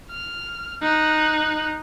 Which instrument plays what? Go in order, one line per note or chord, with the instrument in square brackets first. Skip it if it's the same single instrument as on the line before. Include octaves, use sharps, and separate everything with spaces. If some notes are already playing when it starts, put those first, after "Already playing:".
[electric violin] F6
D#4 F#6